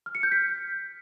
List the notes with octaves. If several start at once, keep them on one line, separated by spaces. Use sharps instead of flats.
F6
C#7
G6
B6